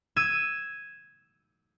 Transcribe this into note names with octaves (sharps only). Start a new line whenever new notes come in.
E6 G#6 D#7